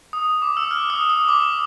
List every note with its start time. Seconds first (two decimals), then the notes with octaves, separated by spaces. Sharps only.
0.13 D#6
0.42 D6
0.57 E6
0.71 F6
0.90 D#6
1.10 D#6
1.28 D6